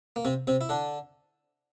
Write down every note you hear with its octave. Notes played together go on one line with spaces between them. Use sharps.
A#3
C3 C4
C3 C4
E4
D3 D4